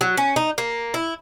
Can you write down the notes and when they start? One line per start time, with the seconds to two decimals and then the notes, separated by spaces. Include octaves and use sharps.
0.01 F#3
0.17 C#4
0.36 D#4
0.58 A#3
0.94 E4